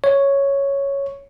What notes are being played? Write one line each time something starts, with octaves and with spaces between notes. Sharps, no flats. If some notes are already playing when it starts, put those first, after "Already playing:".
C#5